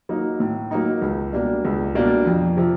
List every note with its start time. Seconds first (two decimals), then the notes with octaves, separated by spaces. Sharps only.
0.09 F#3 A#3 D#4
0.40 A2
0.71 F#3 A#3 D#4
1.02 C#2
1.33 B2 G3 A#3 D4
1.65 C#2
1.95 B2 G3 A#3 D4
2.26 F2
2.57 C3 F3